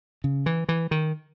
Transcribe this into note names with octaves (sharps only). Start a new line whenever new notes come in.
C#3
E3
E3
D#3